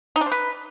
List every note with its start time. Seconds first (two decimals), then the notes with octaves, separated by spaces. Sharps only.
0.16 D#4
0.21 D4
0.26 C5
0.32 B4